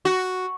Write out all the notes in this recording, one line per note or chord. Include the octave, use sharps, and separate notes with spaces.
F#4